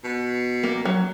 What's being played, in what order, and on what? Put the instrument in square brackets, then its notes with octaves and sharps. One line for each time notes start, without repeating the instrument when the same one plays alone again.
[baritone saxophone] B2
[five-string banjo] A#3
F#3